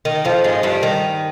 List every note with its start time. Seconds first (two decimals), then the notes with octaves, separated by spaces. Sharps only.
0.05 D#3
0.25 F2 F3
0.44 G#2 G#3
0.63 G2 G3
0.83 D#3